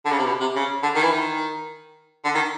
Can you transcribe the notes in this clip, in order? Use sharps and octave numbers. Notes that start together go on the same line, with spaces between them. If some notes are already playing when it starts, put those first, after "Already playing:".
D3
C#3
C3
B2
C3
C#3
D3
D#3
E3
D#3
D3
D#3